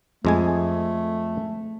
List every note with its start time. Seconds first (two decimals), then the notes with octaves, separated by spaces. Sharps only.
0.25 F2 G#3 A3 G#5